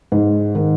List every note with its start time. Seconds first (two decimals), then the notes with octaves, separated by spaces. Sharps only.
0.12 G#2
0.55 D#3